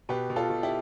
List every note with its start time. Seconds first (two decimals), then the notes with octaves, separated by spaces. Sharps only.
0.09 B2 G4 B4
0.30 B2
0.36 F4 A4
0.50 B2
0.63 E4 G4